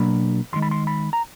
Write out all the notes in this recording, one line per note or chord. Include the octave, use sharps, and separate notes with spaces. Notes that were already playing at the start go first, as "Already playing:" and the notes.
Already playing: B2 F#3 A#3 D4 B5
D#2 D#3 G#3 C6
B5
C6
B5
A#5